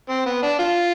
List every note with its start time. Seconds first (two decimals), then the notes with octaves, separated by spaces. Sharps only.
0.09 C4
0.26 B3
0.42 D4
0.59 F4